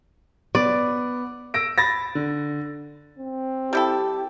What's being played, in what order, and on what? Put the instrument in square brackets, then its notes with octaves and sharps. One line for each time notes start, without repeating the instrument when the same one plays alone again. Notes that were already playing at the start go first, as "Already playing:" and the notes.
[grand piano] B3 [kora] D5
[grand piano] E6 A#6 D7
B5 A6 A#6
D3
[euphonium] C4
[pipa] G3 E4 A4 [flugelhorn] G4